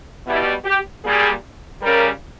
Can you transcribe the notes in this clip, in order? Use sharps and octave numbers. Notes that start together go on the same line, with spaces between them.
B2 G3 E4
G4
A#2 G3 G#4
C#3 G3 A#4